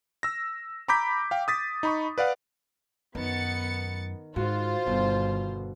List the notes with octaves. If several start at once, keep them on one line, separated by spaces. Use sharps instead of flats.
E6 A#6
A#5 B5 D6 G6 B6
F5 G5
D#6 A6 B6
D#4 B5 C#6
B4 D5 F5 F#5
F#2 D#3 B3 A6 C#7
G#2 F4 F#4 C5
G1 B2 D#3